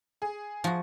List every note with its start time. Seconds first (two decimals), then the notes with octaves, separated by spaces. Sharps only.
0.22 G#4
0.64 F3 F#4